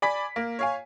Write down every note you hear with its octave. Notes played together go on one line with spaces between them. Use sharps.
D5 G#5 B5 D6 B6
A#3
C#5 F5 G#5